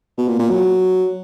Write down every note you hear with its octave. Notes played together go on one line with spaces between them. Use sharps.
B2
A#2
A#2
F#3